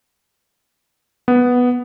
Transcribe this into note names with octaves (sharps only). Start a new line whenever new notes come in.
B3